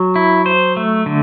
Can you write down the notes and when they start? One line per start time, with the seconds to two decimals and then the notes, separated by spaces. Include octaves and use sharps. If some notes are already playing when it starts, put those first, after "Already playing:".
Already playing: F#3
0.16 E4
0.46 C5
0.77 A3
1.06 D3